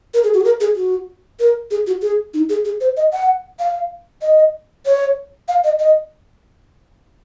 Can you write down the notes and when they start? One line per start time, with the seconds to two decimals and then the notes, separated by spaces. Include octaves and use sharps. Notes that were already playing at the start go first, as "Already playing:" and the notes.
0.14 A#4
0.24 G#4
0.34 F#4
0.41 G#4
0.44 A#4
0.61 G#4
0.76 F#4
1.40 A#4
1.71 G#4
1.87 F#4
2.02 G#4
2.34 D#4
2.49 G#4
2.65 G#4
2.81 C5
2.97 D#5
3.13 F#5
3.59 F5
4.22 D#5
4.86 C#5
5.48 F5
5.64 D#5
5.80 D#5